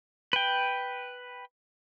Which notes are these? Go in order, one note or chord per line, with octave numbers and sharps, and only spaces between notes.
B4 G5